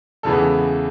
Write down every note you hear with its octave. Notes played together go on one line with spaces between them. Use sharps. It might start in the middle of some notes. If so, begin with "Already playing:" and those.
E2 C#3 E3 G#3 B3 A4